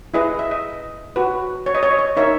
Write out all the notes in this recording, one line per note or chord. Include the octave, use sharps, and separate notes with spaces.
E4 G#4 B4 D#5
E5
D#5
F#4 B4
C#5
D#5
C#5
D#5
C#5
D#4 A#4 C#5 E5